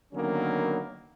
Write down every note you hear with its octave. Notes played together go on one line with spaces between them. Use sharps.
D3 D#3 F#3 A#3 B3 C#4